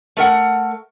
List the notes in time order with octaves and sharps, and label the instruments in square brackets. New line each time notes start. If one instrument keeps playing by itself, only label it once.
[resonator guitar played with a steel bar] A3 A#4 F#5